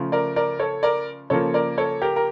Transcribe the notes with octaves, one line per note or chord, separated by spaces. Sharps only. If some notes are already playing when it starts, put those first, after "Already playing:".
Already playing: C#3 F3 A3
A#4 D5
A#4 D5
A4 C#5
A#4 D5
C#3 F3 A#3 A4 C#5
A#4 D5
A4 C#5
G4 A#4
A#4